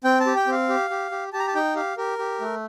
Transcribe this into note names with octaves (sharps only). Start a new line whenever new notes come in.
C4 G5
A5
G4
G5
C4 F5
G4
G4
G4
G4 A5
A#5
A5
D#4 G5
G4 F5
G4 A#4
G4
A3